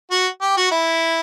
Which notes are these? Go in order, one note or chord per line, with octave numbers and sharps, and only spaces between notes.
F#4
G4
F#4
E4